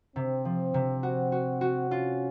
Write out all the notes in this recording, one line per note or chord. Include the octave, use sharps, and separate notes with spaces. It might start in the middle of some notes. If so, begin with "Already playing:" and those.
C3 C4
F3
C3
F#4
F#4
F#4
C#4 F4